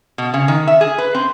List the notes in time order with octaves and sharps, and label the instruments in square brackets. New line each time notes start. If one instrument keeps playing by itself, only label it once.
[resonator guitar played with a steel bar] B2
C#3
D#3
E5
G#4
B4
C4